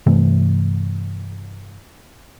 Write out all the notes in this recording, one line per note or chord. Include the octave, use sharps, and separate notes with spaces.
G2 C3 E3 A3